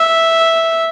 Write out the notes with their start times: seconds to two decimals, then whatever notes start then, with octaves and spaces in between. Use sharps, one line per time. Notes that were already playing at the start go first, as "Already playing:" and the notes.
Already playing: E5